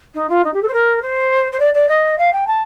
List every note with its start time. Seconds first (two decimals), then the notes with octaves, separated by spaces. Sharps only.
0.14 D#4
0.29 F4
0.44 D#4
0.53 G4
0.62 A4
0.67 C5
0.73 A#4
1.01 C5
1.52 C5
1.59 D5
1.74 D5
1.88 D#5
2.18 F5
2.32 G5
2.47 A5